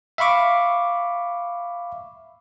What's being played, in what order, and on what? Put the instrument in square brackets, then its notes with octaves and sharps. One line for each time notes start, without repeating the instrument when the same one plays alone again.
[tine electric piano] E5 F5 B5 C#6 D6